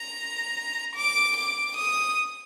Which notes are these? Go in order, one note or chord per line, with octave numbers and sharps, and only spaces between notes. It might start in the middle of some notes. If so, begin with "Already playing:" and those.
Already playing: A#5
D6
D6
D#6